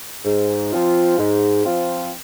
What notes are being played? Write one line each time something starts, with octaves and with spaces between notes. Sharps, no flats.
G#2
F3 C4 F4
G#2
F3 C4 F4